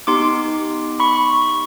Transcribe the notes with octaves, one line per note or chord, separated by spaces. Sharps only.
B3 D#4 G4 C6 D6
B5 C#6